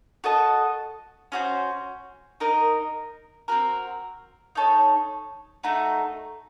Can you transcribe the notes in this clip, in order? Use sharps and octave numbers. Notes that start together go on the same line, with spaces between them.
F#4 A4 D#5 A5
C#4 F#4 A4 C5
D#4 A#4 D#5
C4 F#4 A#4
D#4 A4 C#5
A3 D#4 F#4